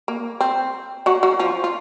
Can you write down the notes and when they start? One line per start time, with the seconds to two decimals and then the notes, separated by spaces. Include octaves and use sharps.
0.08 A#3
0.41 C4
1.06 F#3 F#4
1.23 F#3 F#4
1.40 F3 F4
1.64 F4